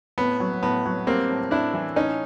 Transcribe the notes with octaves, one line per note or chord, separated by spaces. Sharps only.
A2 B3
F#3
A2 B3
F#3
G3 A#3 C4
A2
A2 D4 E4
E3
A2 C#4 D#4